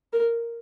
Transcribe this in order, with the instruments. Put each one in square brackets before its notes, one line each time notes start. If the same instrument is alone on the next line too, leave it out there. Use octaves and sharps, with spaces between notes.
[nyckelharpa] A#4